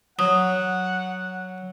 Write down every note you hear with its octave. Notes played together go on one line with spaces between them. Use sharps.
F#3 F#5 D#6